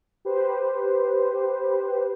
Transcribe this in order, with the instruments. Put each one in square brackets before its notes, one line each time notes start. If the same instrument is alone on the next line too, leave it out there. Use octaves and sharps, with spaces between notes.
[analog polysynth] G4 B4 C5